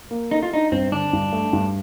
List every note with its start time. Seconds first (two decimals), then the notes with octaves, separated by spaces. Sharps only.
0.11 A#3
0.31 D#4 A4
0.43 F4
0.52 D4 D#4
0.72 G2 C4
0.92 D3 D4
1.13 G2
1.33 A3
1.53 G2